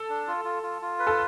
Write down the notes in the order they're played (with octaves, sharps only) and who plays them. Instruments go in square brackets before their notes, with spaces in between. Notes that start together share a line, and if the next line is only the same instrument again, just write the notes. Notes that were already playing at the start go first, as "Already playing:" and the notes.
Already playing: [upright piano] A4
[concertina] D4
F4
F4
F4
F4
B4
[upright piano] A4